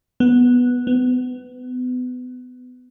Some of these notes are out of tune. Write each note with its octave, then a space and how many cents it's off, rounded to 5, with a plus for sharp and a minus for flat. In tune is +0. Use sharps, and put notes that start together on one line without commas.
B3 -5
B3 +25